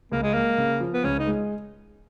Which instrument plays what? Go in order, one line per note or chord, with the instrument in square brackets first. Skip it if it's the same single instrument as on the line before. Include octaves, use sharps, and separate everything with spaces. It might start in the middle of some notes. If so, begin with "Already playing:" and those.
[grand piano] C#2 [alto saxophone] A#3
[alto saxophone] G#3
[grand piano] G#3 [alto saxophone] A#3
[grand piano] C#3
F3
[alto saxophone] B3
[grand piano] C#2 [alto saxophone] C#4
[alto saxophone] D#4
[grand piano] G#3